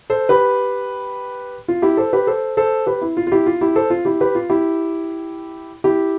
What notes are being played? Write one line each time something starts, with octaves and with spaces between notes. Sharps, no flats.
A4 C5
G4 B4
F4
E4 G4
A4 C5
G4 B4
A4 C5
A4 C5
G4 B4
E4
F4
F4
E4 G4
F4
E4 G4
A4 C5
F4
E4 G4
G4 B4
F4
E4 G4
E4 G4